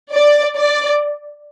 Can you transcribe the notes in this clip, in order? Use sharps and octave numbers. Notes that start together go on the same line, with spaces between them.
D5
D5